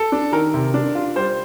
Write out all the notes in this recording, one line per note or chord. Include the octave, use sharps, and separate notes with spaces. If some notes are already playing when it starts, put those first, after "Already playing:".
Already playing: A4
D4
D#3 A#4
C3
D4
F4
G3 C5